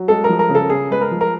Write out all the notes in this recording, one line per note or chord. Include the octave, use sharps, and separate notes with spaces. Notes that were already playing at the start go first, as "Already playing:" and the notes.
Already playing: F#3
G#3 A4
A#4
F3
A#4
C#3
A4
C#3 G#4
G#3 B4
A#4
F3
A#4